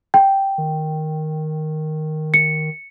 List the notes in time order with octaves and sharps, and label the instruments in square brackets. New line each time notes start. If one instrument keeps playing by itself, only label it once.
[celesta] G5
[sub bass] D#3
[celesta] C#7